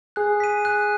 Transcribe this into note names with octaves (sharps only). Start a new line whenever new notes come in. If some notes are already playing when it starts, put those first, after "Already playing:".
G#4 F#6
B6 D#7
F#6